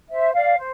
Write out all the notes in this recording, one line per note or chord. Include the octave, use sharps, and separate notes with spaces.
C5 E5
D5 F5
C5